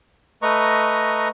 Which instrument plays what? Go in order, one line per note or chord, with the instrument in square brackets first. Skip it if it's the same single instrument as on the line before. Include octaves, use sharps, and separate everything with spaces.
[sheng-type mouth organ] A3 B4 D#5 A#5 C#6